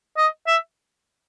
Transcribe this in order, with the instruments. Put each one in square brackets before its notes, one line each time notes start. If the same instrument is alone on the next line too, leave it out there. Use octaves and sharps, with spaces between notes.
[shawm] D#5
E5